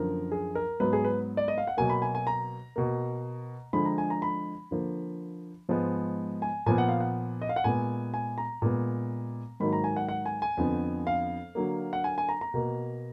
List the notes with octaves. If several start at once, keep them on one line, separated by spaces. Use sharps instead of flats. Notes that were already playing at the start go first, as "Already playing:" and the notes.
Already playing: F#2 D3 F3 A#3 A#4
G#4
A#4
G#2 F#3 B3 B4
G#4
B4
D5
D#5
F5
F#5
B2 F#3 A#3 G#5
B5
G#5
G#5
A#5
B2 A#3
D3 F3 G#3 B5
A#5
G#5
A#5
B5
D3 F3 A#3
G#2 F3 G#3 B3
G#5
A#2 F3 B3 G#5
F#5
F5
F#5
D#5
F5
F#5
A#2 G#3 B3 G#5
G#5
A#5
A#2 G#3 B3
G#2 D#3 F#3 A#3 B5
A#5
G#5
F#5
F#5
G#5
G#5
F2 D3 F3 B3
F5
D3 F#3 A#3
F#5
G#5
G#5
A#5
A#5
B2 A#3